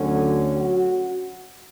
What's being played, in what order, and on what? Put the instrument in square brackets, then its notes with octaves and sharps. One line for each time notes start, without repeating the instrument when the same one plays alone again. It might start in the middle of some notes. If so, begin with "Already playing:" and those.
Already playing: [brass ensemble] D2 D3 F#3 C#4 F#4
F#3 F#4